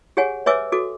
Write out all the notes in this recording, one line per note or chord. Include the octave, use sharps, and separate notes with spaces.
G4 G#4 C#5 F#5 G#5
B4 C#5 E5 G#5 D6 E6
F#4 A4 D6